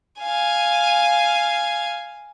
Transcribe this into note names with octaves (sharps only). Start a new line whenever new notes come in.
F5 G#5